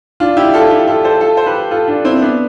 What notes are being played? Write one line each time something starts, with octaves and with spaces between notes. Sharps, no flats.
D4 F4
E4 G4
F4 A4
E4 G4
F4 A4
A4 C5
F4 A4
C5
G4 B4
F4 A4
D4 F4
C4 E4
B3 D4